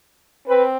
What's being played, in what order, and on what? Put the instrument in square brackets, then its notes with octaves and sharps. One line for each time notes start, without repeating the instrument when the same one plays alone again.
[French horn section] C4 B4